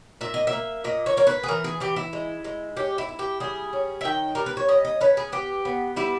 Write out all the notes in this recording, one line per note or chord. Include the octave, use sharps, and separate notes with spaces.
A#2 E5
D#5
E5
A#3
A#2 D#5
C#5
A#3 C#5
B4
G#4
E3 A#4
G#4
E3 G4
E4
G#3
G#3
C#4 G4
E4
E4
G4
G3 G#4
C#4
E5
D#3 G5
G3 A#4
B4
C#5
C#4 D#5
D#5
C#4 B4
G#4
B3 G4
B3
G3 E4